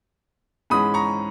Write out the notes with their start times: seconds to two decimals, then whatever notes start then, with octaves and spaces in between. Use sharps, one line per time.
0.70 G#2 E3 G#3 C#4 B5 D#6
0.94 A#5 C#6